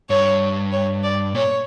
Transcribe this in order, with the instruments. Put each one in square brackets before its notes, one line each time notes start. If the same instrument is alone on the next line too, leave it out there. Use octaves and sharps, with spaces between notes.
[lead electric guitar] G2 [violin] C#5
[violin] C#5
D5
[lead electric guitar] A#2 [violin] C#5